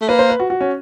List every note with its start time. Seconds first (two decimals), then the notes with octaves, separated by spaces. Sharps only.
0.01 A3
0.09 A#3 B4
0.19 C5
0.30 B4
0.40 F#4
0.50 F#4
0.61 C#4